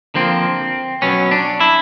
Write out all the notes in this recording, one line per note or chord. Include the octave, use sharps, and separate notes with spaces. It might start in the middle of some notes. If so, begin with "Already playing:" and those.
D3 F3 A#3 C4
B2 F#3 B3 C#4
D4
E4